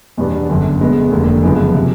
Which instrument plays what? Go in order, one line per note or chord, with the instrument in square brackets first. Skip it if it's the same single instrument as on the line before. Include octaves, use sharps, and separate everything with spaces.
[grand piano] E2 B2 G3 B3 D4
G1 F#2 D3
B2 G#3 B3
F1 D#2 D3
F#2 C#3 F3 G#3 B3
C3